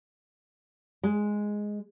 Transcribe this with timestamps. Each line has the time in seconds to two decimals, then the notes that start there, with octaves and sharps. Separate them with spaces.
1.04 G#3